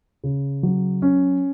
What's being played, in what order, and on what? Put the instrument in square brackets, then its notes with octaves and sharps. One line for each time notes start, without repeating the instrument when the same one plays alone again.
[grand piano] C#3
F#3
C#4